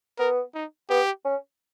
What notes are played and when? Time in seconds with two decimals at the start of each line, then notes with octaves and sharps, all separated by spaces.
0.19 B3 A#4
0.54 D#4
0.90 B3 G4
1.25 C#4